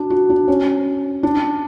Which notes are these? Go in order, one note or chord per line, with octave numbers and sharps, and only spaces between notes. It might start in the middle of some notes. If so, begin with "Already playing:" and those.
Already playing: D4 F#4
F#4
D4
C#4
D4